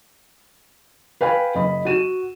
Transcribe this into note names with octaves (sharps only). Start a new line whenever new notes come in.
B4 F5 G5 G#5 B5
F#1 D#5 B5
F#4 D#7 E7